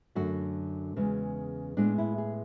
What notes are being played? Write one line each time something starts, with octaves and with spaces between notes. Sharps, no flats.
F#2 D3 A3 F#4
E2 C#3 G#3
A2 G#3 B3 D4
E4
G#4